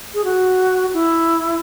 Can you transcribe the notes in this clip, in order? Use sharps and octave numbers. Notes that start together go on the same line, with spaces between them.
G#4
F#4
E4